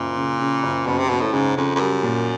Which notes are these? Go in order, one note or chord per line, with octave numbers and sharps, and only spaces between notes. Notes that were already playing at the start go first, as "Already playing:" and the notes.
Already playing: F#1 A#2
C#3
C#3
F#1
F#1 B2
C3
F#1 B2
A2
G#2 C#3
F2 C#3
F2
F#2 G3
A#2